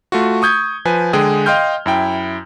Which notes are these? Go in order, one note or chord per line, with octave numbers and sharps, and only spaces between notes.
A3 F4 F#4
C#6 D#6 G6 G#6
F3 B4 G#5
D3 G#3 G#4 G5 D#6
D#5 F5 G5 C6 F6 G6
F#2 E4 G5